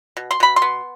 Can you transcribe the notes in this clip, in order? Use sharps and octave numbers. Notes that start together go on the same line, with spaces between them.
B2
C6
B2 B5
C6
B3